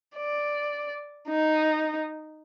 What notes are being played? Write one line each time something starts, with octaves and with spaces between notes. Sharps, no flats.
D5
D#4